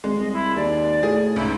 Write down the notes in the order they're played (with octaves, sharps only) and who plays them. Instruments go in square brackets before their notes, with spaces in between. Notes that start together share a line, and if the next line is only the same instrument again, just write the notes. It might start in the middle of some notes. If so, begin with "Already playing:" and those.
[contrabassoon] G#1 [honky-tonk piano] G#3
[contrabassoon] C2 [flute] D#5
[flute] E4
[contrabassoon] D#2 [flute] D5
[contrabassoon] A2 [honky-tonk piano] G#4
[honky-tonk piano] C#2 G#2 [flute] E4